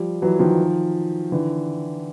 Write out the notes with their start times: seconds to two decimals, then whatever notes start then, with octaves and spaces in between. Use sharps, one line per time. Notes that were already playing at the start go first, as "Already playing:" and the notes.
Already playing: F3 G3
0.22 E3 F#3
0.39 D#3 F3
1.32 D3 E3